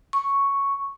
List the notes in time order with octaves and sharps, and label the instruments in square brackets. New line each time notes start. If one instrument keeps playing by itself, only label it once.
[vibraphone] C#6